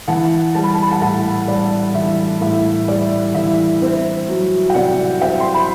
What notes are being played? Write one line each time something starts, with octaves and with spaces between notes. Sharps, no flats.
E3 F#5 A5
G3 A5
B5
A5
B5
F#5 A5
A2 F#5 A5
G3 D5 F#5
E3 E5
A2 E5
G3 D5
E3 E5
C4
F#3
G5
C3 D5 F#5
C4 E5 G5
C6
B5